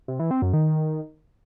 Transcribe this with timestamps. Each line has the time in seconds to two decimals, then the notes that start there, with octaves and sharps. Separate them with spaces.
0.08 C3
0.19 E3
0.31 C4
0.42 F#2
0.53 D#3